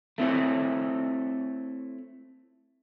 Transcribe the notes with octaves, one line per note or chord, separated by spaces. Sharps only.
A3 C4 E4 C#5